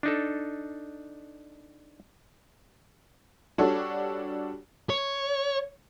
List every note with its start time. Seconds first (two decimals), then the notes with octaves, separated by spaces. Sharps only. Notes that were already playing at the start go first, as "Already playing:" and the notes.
0.03 D4 D#4 A4
3.58 G3 D4 F#4 A4 C#5
4.90 C#5